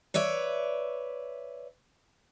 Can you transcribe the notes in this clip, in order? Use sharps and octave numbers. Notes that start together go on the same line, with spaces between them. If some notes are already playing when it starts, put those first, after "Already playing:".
B4 C#5 D5 E5